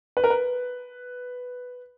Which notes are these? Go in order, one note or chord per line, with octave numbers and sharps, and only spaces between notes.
B4
A#4
B4